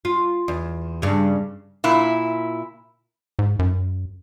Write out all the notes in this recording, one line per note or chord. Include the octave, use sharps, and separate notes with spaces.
F4
E2
G2 C#3
A#2 E4
G#2
F#2